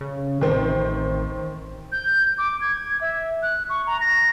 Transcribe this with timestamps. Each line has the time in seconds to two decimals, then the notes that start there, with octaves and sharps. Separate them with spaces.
0.01 C#3
0.41 A1 D#3 C4
1.92 G6
2.38 D6
2.61 G#6
3.01 E5
3.43 F#6
3.70 C#6
3.87 A#5
4.01 A#6